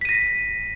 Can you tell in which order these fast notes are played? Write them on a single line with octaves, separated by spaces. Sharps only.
B6 D#7 A#6